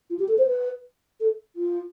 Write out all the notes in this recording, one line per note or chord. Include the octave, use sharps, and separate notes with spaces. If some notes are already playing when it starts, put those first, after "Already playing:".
F4
G4
A4
C5
B4
A4
F4